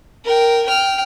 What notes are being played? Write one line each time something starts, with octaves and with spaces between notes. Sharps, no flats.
A#4 G5
G5 F6